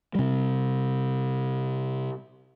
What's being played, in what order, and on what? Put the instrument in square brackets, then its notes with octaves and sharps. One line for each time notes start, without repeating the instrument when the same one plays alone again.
[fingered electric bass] C3 G3